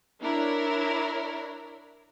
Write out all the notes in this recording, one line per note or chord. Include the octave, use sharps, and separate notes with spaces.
D4 E4 A#4 C#5 B5